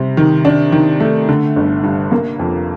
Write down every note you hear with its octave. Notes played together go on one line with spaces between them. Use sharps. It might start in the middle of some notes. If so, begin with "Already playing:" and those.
Already playing: C3 G3
D#3
D4
D#3
A3
D3
G1
G2
A#3
F2